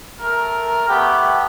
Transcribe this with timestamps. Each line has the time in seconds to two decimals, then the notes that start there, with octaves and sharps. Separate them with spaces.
0.19 A3 A#4
0.88 A3 B3 G4